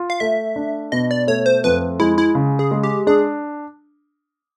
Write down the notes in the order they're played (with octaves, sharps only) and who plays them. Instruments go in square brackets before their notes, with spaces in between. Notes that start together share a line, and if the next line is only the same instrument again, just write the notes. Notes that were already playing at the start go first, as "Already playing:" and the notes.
Already playing: [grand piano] F4
[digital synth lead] F5
[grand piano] A3 [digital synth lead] E5
[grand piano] D4
[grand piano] B2 [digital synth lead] D#5
[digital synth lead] D5
[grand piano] A3 [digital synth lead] C#5
[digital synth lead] C5
[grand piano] F2 [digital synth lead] B4
[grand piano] G#3 [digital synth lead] E4
[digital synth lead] E4
[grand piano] C#3
[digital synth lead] G#4
[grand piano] G#3
[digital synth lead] G4
[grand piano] D4 [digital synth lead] G#4